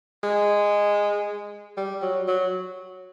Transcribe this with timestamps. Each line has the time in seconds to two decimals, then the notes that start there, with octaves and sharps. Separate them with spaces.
0.23 G#3
1.77 G3
2.02 F#3
2.28 F#3